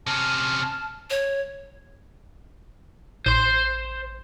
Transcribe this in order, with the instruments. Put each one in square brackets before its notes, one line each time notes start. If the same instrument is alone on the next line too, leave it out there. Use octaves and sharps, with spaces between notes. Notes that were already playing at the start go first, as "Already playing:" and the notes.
[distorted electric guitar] C3 C#4 [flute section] A5 F6
[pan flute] C#5
[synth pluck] A1 [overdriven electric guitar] C5 C6